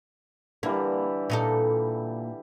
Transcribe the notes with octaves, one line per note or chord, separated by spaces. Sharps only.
D3 E3 G3 A#3
A#2 D#4 A4